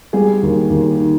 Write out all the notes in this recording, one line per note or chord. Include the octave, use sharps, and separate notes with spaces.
G3 G#4
D#2
D#2
D#3